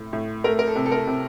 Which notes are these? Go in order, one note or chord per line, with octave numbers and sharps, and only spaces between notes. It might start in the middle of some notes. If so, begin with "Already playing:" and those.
Already playing: A2
A2
A3 A#4
A#4
A4
C3
A4
A#4
C3